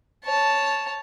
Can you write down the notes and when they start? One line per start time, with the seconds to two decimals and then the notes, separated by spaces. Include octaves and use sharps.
0.25 C#5 A5